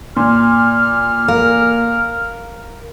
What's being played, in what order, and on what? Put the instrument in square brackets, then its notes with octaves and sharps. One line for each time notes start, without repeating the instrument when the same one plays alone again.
[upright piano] A#2 [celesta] C6 [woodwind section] F6
[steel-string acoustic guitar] A#4 [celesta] F5